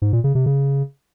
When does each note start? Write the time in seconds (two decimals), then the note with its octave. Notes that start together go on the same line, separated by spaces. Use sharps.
0.02 G#2
0.13 A#2
0.24 C#3
0.35 C3
0.46 C#3